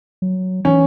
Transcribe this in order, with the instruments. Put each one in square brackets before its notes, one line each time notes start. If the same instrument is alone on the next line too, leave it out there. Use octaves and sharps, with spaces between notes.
[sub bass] F#3
[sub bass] E3 [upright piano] C#4